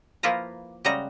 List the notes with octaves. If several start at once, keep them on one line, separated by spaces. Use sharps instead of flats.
F3 A#3 E4 F4 B4 A#5
C#3 G3 G#3 F#4 D#5 A#5